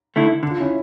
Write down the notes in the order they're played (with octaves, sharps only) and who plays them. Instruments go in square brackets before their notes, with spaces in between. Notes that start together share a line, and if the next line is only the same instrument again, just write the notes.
[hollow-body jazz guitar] D3 A3 E4
D3
[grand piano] F4
C#4 E4